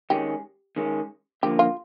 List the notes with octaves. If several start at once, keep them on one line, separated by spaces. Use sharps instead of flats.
D#3 G#3 C#4 G4
D#3 G#3 C#4
D3 F3 A#3 G4
F4